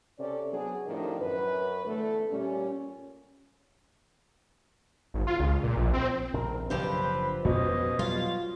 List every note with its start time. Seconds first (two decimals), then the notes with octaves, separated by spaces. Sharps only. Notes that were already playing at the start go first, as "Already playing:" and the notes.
0.18 C3 C#4 A4 D5
0.50 F#3 B3 D4 G#4
0.86 A2 C3 D#3 F3 D4
1.19 F#2 B4
1.85 E2 D3 A3
2.30 A#2 G3 C#4
5.14 G#1
5.27 F4
5.39 C#2
5.63 A#2
5.77 A#1
5.94 C4
6.34 A#1 A2 C4 A#4
6.70 F#1 F3 F#3 C4 D4 G4 B4
7.45 F2 B2 B3 C#4 D#5
7.99 F#3 G3 F4